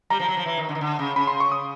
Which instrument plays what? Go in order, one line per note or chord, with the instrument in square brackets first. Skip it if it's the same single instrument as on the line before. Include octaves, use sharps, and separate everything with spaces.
[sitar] G3 [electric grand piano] A#5
[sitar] F3
F#3
F3
E3
D#3
D3
D#3
D3
C#3
[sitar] C#3 [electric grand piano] B5
[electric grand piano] C6
C#6
D#6